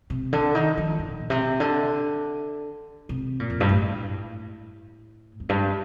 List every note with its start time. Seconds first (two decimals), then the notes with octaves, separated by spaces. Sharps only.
0.10 C3
0.33 D3
0.55 D#3
0.77 F3
0.99 D#3
1.10 A2
1.20 A#2
1.30 C3
1.60 D3
3.09 C3
3.40 A#2
3.50 F2
3.60 G2
3.69 A2
5.40 F2
5.49 G2